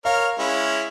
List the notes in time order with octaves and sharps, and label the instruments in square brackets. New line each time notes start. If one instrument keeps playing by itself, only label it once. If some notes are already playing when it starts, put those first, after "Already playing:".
[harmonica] A#4 C#5 [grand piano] F5
[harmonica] G#3 C#4 E4